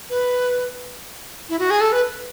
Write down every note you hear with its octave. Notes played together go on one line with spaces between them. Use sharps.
B4
E4
F#4
G#4
A4
B4